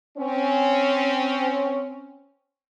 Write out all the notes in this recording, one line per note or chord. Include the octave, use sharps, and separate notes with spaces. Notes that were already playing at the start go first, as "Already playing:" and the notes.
C4 C#4